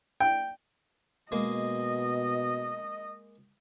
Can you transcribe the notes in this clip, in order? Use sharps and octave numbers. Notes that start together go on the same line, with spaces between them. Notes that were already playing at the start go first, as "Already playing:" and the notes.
G5
B2 G#3 A#3 D#5